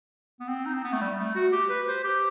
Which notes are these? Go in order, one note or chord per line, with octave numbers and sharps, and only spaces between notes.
B3
C4
D#4
C4
B3
A3
G3
A3
F#4
G4
B4
C5
G4